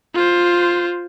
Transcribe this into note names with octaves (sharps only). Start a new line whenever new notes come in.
F4 C5